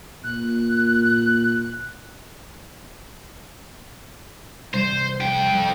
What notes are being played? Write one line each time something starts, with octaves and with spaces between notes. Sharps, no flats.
A#2 F#6
C2 G2 C5
F2 G5